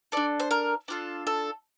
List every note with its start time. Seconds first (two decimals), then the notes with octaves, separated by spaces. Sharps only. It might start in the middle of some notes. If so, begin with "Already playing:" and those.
0.12 D4 A4 D5
0.40 C5
0.51 A#4
0.88 D4 F4 A4
1.27 A4